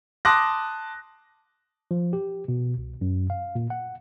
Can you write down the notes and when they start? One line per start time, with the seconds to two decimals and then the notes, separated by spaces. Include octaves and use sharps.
0.25 A5 C6 D6 D#6 F#6 A#6
1.91 F3
2.13 G4
2.48 B2
2.78 C2
3.01 F#2
3.30 F5
3.55 A#2
3.70 F#5